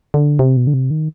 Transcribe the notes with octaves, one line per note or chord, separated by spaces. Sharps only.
D3
C3
B2
D3
C3
D#3